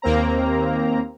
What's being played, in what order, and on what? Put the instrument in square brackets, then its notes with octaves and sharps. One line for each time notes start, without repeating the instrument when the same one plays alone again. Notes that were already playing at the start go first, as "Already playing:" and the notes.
[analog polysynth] D#2 A#3 C4 A#5